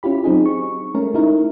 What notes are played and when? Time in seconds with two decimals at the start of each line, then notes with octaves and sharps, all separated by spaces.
0.03 C#4 E4 F4 G4 B5
0.24 F#3 C4 D#4 G#4
0.46 C#6
0.95 G#3 A3 C#4 A#4
1.14 A3 D#4 E4 A#4